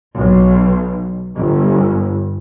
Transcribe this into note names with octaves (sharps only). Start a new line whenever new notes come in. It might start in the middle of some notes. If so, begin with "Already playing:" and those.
B1
G1